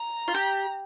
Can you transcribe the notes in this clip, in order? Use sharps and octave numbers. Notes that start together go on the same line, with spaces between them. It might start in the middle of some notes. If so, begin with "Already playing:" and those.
Already playing: A#5
F4
G4